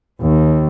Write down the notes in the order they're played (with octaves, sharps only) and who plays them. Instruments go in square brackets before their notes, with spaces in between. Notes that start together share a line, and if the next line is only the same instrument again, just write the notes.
[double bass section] D#2